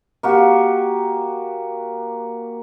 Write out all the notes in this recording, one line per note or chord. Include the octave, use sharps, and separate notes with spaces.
A#3 F#4 G4